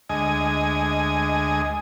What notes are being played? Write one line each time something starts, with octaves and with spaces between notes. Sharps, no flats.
D2 G#3 D#5 G#5